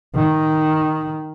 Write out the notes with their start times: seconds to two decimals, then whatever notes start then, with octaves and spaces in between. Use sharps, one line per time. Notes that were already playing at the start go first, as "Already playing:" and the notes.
0.15 D#3